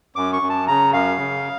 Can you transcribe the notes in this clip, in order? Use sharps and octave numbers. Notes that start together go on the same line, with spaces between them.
F#2 D6
C#6
F#2
A5
C#3 A#5
F#2 F5
C#3